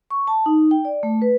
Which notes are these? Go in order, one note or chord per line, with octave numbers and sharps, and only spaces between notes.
C#6
A5
D#4
G5
D5
A3
B4